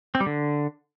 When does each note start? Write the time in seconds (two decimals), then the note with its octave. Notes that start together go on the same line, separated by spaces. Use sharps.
0.15 C4
0.20 G3
0.26 D3